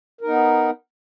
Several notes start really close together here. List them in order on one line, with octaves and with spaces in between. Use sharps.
A#4 D#4 B3